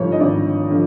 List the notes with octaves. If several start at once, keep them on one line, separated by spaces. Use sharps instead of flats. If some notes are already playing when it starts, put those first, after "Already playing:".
Already playing: G#1 G2 D3 F3 C#5
D#5
G#1 D5
D3 F3